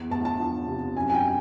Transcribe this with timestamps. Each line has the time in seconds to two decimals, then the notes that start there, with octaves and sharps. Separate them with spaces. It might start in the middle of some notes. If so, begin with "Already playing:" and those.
Already playing: E2
0.11 E2 A5
0.25 A5
0.39 F3
0.67 C3
0.96 F#2 G#5
1.10 G#5
1.14 G5